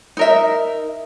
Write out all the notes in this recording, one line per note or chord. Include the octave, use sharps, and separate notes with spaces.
D#4 A#4 E5